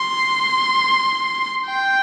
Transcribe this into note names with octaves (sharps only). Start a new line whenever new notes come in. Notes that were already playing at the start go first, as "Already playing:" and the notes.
Already playing: C6
G5